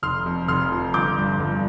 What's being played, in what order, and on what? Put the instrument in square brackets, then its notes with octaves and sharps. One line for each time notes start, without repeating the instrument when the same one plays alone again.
[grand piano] F1 C6 F6
F2
F1 C6 F6
F3
G1 D6 G6
G2
G1